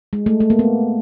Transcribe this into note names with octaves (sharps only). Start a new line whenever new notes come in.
G#3
A3
A3
A#3
B3